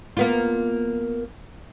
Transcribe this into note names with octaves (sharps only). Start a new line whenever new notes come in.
A#3 B3 F4